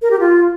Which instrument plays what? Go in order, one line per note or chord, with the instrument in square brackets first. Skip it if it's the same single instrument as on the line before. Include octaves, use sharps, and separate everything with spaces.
[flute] A#4
G4
F4